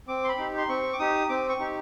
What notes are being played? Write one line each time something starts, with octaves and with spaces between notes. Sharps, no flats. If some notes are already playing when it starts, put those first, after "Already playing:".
C4 D6
C6
B5
D#4 G4
C6
C4 C#6
D6
D#4 G4 D#6
C4 D6
C#6
D#4 G4